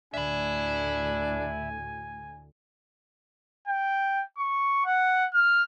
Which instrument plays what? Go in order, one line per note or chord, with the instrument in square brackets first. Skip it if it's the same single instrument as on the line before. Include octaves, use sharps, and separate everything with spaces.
[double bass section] D2 A2 [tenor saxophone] D4 [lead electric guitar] E5 B5 [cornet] G#5
[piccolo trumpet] G5
C#6
F#5
F6